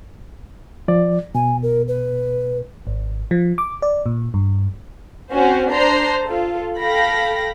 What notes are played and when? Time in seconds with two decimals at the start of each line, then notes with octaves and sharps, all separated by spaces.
0.88 F3 D5
1.35 B2 G#5
1.63 A#4
1.88 B4
2.87 G#1
3.31 F3
3.58 D6
3.82 D5
4.06 A#2
4.34 G2
5.30 C4 C#4 F#4 C5
5.70 D4 C5 A#5 C6 C7
6.24 F4 A4
6.80 A4 F5 G5 B5 A#6